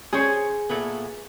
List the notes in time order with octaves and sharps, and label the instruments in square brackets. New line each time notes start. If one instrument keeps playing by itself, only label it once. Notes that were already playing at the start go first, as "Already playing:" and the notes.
[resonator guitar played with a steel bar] C#4 C5 C#5 [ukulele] G#4
[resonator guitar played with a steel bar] A#2 A3 B3